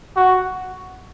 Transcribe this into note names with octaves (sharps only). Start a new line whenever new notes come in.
F#4